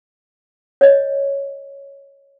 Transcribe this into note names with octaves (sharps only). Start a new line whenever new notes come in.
C#5 D#5